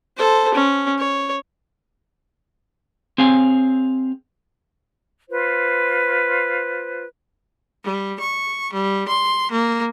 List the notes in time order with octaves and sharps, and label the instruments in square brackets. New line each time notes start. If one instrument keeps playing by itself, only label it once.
[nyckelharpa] A4 C5
C#4
C#5
[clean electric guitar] C4 G#4 C#5 F5 G#5
[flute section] F4 B4 C5
[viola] G3
C#6
G3
C6
A#3